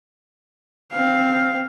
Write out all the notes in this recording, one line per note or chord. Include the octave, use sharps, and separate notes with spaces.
C4 F5